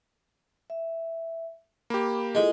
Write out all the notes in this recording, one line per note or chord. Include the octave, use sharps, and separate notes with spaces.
E5
A#3 G4 B5
G#3 E4 F4 A4